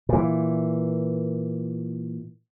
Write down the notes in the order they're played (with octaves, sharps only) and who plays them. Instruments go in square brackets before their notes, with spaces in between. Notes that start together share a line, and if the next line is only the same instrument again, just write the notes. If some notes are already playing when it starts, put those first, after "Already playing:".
[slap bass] A#2 E3